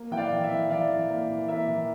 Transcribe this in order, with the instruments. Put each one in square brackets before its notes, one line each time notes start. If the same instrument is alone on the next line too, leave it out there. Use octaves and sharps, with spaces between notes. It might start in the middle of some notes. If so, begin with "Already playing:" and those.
Already playing: [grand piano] A#3
E3 G5
D5 F5
E3
E5
E3
E3 D5 F5
E3
A#3
E3
A#3 E5
E3